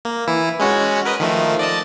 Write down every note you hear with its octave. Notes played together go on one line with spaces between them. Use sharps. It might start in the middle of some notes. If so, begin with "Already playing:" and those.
A#3
E3 E4
G#3 C#4 F#4
A#4 B4 D#5
D#3 F3 A3
D5 D#5 A5